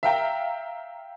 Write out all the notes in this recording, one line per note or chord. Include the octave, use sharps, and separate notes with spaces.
E5 F5 G5 A#5